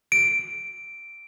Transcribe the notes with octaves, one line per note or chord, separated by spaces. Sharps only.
D7